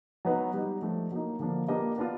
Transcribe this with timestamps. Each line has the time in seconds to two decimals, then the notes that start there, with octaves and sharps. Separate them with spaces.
0.25 F#3 B3 D#4 F#4 B4
0.54 G3 B3 D#4
0.82 F3 A3 D4
1.11 F#3 A#3 D#4
1.40 D3 F3 A#3 D4 F4
1.68 A#3 D4 G4 B4 D#5
1.98 B3 D4 F4